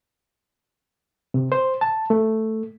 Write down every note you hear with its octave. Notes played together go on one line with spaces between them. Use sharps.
C3
C5
A5
A3